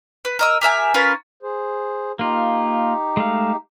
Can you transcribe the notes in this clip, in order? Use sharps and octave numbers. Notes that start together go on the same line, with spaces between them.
B4
A#4 D#5 E6
G4 A#4 E5 G#5
C#4 F4 A#4 B4
G#4 C5
A#3 D#4 F4 G4
G#3 A3 F5